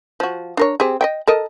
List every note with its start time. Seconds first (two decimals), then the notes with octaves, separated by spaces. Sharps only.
0.20 F3 F#4
0.57 D4 A#4 C#5
0.80 C4 G4 G#4
1.01 D#5 E5 G5
1.28 A4 A#4 D#5